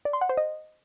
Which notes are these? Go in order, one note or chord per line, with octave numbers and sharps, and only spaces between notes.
D5
C6
F#5
C5
D#5